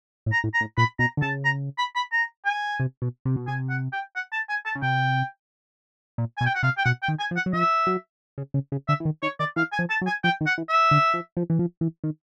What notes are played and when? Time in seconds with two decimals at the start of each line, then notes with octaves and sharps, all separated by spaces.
0.26 A2
0.32 A#5
0.44 A2
0.54 A#5
0.61 A2
0.78 A#2 B5
0.99 B2 A#5
1.17 D3
1.22 C#3 A5
1.45 A#5
1.78 B5
1.96 B5
2.12 A#5
2.46 G#5
2.80 C3
3.02 B2
3.25 C3
3.36 B2
3.47 C3 G#5
3.70 F#5
3.93 G5
4.16 F#5
4.32 A5
4.49 G#5
4.66 A5
4.75 C#3
4.82 C3 G5
6.18 A#2
6.38 B2 G#5
6.46 G5
6.55 F#5
6.63 C3 F5
6.78 G5
6.85 B2 F#5
7.03 G5
7.08 D#3
7.19 G#5
7.31 F3
7.36 F#5
7.46 F#3
7.53 F3 E5
7.87 F#3
8.38 C#3
8.54 C#3
8.72 C#3
8.88 D3 E5
9.00 E3
9.05 D#3
9.22 D#3 C#5
9.39 D#3 D5
9.56 E3 F5
9.73 G#5
9.79 F3
9.90 A5
10.01 F#3
10.07 G#5
10.24 F3 G5
10.41 D#3
10.46 F#5
10.58 E3
10.69 E5
10.91 D3
11.14 F3
11.37 F3
11.50 E3
11.59 F3
11.81 E3
12.04 D#3